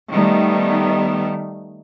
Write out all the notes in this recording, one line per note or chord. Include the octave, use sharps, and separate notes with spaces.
D#3 G3 A3 B3